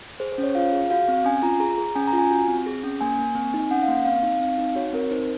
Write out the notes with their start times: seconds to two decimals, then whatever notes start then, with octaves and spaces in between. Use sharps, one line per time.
0.20 G#4 C5
0.32 C5
0.38 C#4
0.43 C#5
0.55 F4 F5
0.73 G#4
0.90 F#4 F5
1.08 C4
1.25 C#4 G#5
1.42 F4 A#5
1.60 G#4 A#5
1.78 G#4
1.95 C#4 G#5
2.07 A#5
2.13 F4
2.18 G#5
2.31 F#4
2.48 C4
2.66 G#4
2.83 C#4
3.01 A#3 G#5
3.19 A#3
3.35 C4
3.54 D#4
3.71 C#4 F#5
3.82 F5
3.88 A#3
4.05 C4 F5
4.23 D#4
4.40 C4
4.58 D#4
4.76 F#4 C#5
4.93 C4 A#4
5.11 D#4 C5